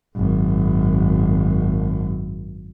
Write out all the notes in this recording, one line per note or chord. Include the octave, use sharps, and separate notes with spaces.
G#1 F#2